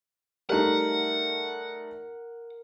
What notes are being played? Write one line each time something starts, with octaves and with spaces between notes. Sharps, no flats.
G3 A3 D#4 A#4 F#5